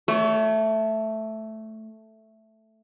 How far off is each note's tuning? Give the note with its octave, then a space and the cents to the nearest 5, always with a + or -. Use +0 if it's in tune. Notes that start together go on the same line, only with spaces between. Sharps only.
A3 +0 C#5 +40